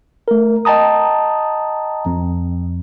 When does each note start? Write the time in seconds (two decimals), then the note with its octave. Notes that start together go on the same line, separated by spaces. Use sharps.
0.28 A3 A#4
0.65 D#5 G5 A5 A#5 D#6
2.06 F2